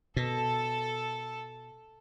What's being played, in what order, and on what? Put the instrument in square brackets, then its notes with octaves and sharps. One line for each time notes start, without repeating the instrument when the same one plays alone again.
[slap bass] B2 [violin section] A4